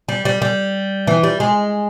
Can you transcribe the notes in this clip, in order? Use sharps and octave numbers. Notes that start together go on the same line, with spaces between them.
G3
G3
G3
E3
G3
G#3